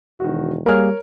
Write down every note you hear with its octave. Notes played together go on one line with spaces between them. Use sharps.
E1 D#3 F#4
G3 A#3 G#4 A#4 C#5 F6